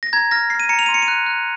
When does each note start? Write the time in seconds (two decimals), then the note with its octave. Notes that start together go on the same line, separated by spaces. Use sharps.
0.03 A#6
0.13 A#5 G#6
0.31 F6 A#6
0.50 F6 C7
0.60 D#7
0.69 A#5 C#7
0.79 F7
0.86 C6 D#7
0.94 C#7
1.02 D#7
1.08 F#6
1.26 F#6